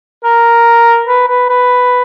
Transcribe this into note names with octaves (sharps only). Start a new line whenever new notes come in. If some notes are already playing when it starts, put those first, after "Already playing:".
A#4
B4
B4
B4